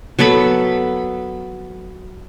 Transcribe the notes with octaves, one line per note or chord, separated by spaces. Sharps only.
F#3 B3 A4 B5